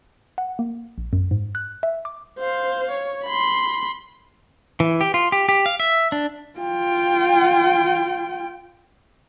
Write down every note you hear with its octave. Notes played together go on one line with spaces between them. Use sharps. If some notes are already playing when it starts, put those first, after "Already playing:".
F#5
A#3
A#1
F#2
G#2
F#6
E5
D6
C5 F5
C#5
B5 C6
E3
G4
F4
G4
G4
F5
E5
D4
F4 G5